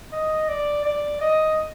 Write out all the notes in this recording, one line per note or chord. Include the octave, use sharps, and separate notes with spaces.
D#5
D5
D5
D#5